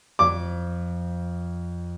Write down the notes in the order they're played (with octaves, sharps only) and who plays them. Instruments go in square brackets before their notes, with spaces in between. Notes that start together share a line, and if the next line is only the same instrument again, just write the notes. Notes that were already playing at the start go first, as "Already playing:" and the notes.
[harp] F2 [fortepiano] D6